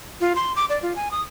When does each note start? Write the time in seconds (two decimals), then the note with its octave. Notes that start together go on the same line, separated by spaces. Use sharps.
0.21 F4
0.36 C6
0.56 D6
0.70 D5
0.82 F4
0.96 G#5
1.11 D#6